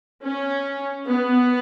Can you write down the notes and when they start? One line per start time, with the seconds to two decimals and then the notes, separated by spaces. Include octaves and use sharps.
0.24 C#4
1.08 B3